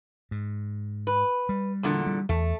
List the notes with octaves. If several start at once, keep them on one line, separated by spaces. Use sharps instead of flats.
G#2
B4
G3
E2 A#2 D3
G3
E2 A3